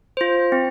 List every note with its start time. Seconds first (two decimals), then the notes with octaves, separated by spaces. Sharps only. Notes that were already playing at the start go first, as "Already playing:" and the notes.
0.17 F4 C5
0.52 C4